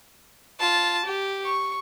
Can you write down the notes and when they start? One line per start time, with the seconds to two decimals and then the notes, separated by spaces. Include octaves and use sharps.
0.60 F4 A5
1.06 G4
1.45 C#6